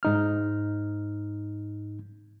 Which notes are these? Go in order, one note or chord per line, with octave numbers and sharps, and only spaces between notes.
G#2 D#4 F6